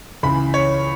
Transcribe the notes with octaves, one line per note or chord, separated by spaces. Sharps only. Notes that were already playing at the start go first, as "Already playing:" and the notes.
C#2 C#3 E3 B5
C#5